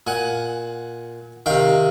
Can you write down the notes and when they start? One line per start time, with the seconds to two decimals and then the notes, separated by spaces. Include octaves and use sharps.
0.07 A#2 F#5 G#5
1.46 C3 D#3 F5 G5